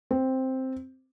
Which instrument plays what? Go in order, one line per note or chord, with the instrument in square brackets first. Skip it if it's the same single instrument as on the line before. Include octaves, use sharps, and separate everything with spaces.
[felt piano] C4